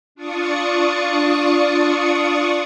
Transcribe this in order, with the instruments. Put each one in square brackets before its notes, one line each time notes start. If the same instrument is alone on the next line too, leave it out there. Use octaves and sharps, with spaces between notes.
[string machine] D4 F4 D5 C#6 D#6 C#7